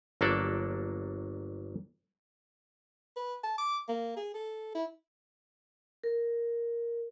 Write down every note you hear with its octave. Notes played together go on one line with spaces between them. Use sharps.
G1 F#3 A#3 D4 A4 D5
B4
A5
D6
A#3
G#4
A4
E4
A#4